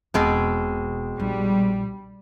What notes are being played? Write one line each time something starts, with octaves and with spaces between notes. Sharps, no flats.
E1 B2 G#3 C4
A#1 G3